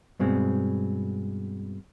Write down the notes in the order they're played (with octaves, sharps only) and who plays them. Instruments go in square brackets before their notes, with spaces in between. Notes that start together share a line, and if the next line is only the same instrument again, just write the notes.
[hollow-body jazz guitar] G2 B2 G#3 C4